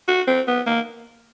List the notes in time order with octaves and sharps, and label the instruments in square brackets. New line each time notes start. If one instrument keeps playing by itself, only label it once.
[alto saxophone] F#4
C4
B3
A#3